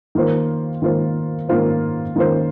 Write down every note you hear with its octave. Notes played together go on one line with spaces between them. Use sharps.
D#3 A#3 F4 C5
D#3 A#3 F4 C5
D#3 A#3 F4 C5
D#3 A#3 F4 C5